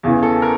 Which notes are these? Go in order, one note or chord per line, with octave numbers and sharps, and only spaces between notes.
E2 C#3 E3
A4
A#4